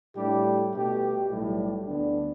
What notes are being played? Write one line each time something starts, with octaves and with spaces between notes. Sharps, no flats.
A2 G3 D4 G4
B2 A3 G4
B1 A2 G3
D2 D3 B3 D4